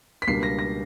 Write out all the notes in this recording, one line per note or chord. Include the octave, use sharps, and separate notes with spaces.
B6
C#2 B2 G3 A#3 D4 C7
A#6
A#6